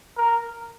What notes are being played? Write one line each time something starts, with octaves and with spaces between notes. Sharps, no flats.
A#4